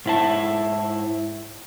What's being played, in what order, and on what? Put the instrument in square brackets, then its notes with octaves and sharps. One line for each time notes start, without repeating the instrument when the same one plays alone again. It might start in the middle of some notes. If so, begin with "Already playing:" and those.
[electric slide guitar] G#2 E4 A5